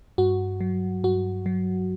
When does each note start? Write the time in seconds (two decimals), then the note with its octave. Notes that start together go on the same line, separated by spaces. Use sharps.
0.18 G2 F#4
0.61 F#3
1.04 G2 F#4
1.46 F#3